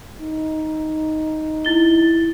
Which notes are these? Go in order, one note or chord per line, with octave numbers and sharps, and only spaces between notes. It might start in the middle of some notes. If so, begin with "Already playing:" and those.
D#4
E4 A6 G7